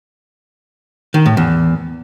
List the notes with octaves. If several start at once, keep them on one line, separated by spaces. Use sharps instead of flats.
D#3
A2
E2